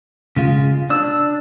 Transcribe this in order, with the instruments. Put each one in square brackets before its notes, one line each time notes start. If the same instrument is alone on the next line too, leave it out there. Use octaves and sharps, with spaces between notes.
[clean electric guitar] C#3 G#3 F4
[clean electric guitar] D4 [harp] E6